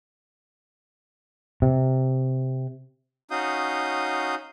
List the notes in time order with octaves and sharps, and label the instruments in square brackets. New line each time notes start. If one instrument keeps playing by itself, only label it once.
[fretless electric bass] C3
[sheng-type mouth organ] C#4 D#4 F#4 F5 D#6 G6